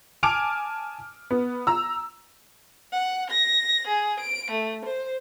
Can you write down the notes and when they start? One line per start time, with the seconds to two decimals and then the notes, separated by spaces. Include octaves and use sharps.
0.23 G#5 A5 D6 F6 D7 F7
1.31 B3
1.67 A#5 E6
2.92 F#5
3.30 A#6
3.87 G#4
4.19 D7
4.51 A3
4.85 C5